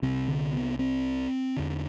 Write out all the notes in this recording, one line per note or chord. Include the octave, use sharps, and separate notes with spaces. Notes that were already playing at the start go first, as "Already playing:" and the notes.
C2 C3 C4
D3
B3
C4
E2 D3